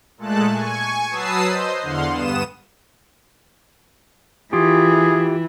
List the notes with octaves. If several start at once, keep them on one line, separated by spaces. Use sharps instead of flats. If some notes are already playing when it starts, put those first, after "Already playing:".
A#2 G#3 A3 A4 A5 F#6
G#5 C#6
F#3 B4 A5 D#6 E6 C7
C5 D#5
E2 D3 F5 F#5 C6
G2 B3 D#6 E7
E3 F4 G4 G#4